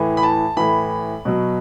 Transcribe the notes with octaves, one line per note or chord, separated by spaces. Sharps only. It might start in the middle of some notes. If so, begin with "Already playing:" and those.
Already playing: A2 E3
B5
A5
A2 E3 B5
B2 F#3